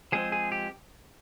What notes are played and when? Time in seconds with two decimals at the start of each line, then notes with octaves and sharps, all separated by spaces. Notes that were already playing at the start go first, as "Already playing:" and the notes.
0.12 F3 G#3 C4 G#4
0.32 G#4
0.52 G4